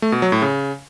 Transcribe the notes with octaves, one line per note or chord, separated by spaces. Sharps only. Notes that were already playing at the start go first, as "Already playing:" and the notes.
A3
B2
F#3
A2
C#3